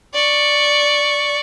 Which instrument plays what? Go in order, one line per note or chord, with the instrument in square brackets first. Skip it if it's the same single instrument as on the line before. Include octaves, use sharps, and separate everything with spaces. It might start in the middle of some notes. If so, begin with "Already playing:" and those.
[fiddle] D5 C#6